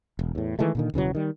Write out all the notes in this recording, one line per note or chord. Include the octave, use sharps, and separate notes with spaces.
E1
E2 A2
D#3 E3 G#3 A3
A#2 D3 D#3
E1 C#3 E3 F#3
D#3 G3